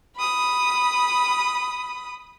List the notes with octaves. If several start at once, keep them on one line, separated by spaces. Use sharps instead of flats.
B5 D#6